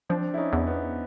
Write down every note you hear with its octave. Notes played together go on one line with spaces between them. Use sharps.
F3 C4 D4
E4
C#4 D#4
E2
B3